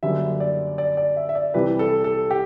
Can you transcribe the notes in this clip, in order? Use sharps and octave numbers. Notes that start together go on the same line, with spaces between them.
F#1 F#2 D3 G3 E5
D5
D5
D5
E5
E5
D5
C2 C3 E3 G3 B4
A4
A4
G4